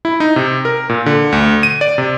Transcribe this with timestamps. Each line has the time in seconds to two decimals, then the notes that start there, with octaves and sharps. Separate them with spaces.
0.05 E4
0.20 D#4
0.36 C3
0.65 A#4
0.89 A#2
1.06 D3
1.32 D2
1.63 D#7
1.81 D5
1.98 C3